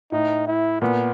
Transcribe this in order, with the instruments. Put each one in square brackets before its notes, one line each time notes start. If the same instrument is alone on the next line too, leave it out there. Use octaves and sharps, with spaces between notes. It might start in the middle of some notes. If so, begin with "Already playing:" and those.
[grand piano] A2 [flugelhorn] D#4
[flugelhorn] E4
[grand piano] A#2 [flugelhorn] B3